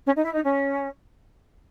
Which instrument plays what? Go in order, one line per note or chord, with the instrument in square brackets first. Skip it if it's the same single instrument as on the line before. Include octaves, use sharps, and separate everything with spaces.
[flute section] C#4
D#4
E4
D#4
C#4